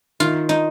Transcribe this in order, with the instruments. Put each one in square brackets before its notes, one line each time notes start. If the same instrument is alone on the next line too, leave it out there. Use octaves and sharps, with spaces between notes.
[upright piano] D#3 [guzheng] F4
[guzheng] D#4